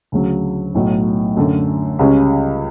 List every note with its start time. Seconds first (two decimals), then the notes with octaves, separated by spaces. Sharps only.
0.12 D2 C#3 F#3
0.75 B1 A2 F#3
1.37 F#2 D3 A3
1.99 C#2 C#3 G3 C#4